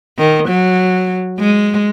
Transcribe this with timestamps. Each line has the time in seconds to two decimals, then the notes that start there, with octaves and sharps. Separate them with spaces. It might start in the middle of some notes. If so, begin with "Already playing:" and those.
0.18 D#3
0.49 F#3
1.39 G#3